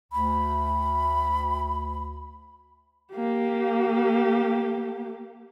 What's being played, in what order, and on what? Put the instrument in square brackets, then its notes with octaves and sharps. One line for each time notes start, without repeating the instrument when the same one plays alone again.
[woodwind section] D2 [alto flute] B5
[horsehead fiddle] A#3 G4